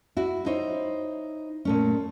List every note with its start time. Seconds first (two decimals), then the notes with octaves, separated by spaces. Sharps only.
0.17 E4 F#4
0.46 D#4 E4 C5 C#5
1.65 A#2 A3 C#4